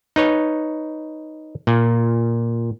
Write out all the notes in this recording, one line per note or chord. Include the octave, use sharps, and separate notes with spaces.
D#4 B4 C#5
A#2